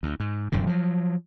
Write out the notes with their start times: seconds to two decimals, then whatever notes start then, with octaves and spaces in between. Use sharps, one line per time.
0.03 D2
0.20 G#2
0.52 E1 F#2 A2 D3
0.67 F3 F#3